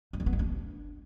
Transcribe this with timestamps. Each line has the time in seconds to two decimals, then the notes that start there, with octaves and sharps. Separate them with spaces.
0.13 A3
0.20 C4
0.26 B3
0.33 A3
0.39 D4